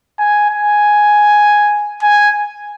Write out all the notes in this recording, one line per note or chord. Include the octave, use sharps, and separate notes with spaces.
G#5
G#5
G#5